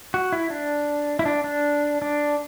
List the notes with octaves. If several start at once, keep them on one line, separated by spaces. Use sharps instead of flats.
F#4
E4
D4
E4
D4
D4
D4